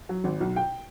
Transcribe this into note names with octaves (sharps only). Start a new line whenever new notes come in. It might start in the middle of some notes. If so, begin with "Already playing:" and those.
F#3
G#1
B1
G5